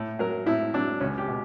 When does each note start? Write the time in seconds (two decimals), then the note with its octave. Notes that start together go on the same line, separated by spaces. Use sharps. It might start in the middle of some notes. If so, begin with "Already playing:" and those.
Already playing: A2
0.19 F#3 A#4
0.46 A2 E4
0.74 F#3 D4
1.00 C#2 C#4
1.18 G4
1.28 B2